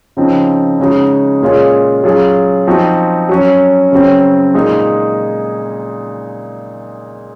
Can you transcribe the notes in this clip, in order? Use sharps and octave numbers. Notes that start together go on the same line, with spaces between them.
C#3 F3 C4 D#4
C#3 G#3 D#4 F#4
A#2 G#3 C#4 F4 G#4
F#3 C#4 F4 G#4
F3 C4 D#4 F#4
F#3 C#4 F#4
C#3 F#3 C4
A#2 G#3 D#4 G#4